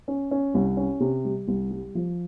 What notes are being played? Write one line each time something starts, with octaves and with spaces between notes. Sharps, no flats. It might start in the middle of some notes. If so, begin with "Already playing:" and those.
C#4
C#4
C2
C#4
C3
G3
C2
G3
F3